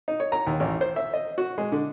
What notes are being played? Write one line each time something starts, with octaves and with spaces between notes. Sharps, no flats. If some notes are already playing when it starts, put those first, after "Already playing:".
D#4
C#5
A#5
D#2
A1
C5
E5
D#5
F#4
G#3
D3